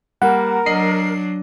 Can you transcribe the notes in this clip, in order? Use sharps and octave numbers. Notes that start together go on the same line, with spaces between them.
G3 A#3 A#4 F#5
F#3 D4 D#5 C7 F#7